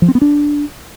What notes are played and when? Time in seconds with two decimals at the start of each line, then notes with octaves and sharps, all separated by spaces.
0.02 F3
0.08 C4
0.15 B3
0.21 D4